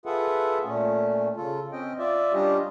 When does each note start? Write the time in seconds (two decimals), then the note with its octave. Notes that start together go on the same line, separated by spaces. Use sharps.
0.06 F4 G#4 A4 B4 E5 F#5
0.65 A#2 A3 C#4
1.37 C#3 F4 A4
1.72 C4 C#4 D#5 G5
1.99 F4 D5 E5
2.33 G3 C#4 D4 F4 G4 D#5